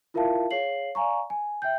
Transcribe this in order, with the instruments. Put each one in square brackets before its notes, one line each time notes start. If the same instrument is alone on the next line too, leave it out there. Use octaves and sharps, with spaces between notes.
[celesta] E4 F4 A#4 E5 F5 A5
G#4 C#5 F5 C7 F#7
D5 F5 G#5 A#5 C#6
G#5
E5 G5 G6